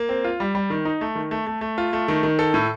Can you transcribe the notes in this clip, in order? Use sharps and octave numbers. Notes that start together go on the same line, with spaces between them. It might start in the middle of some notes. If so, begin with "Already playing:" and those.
Already playing: A#3
C4
F4
G3
G3
D#3
D#4
A3
D#3
A3
A3
A3
F4
A3
D#3
D#3
A4
A2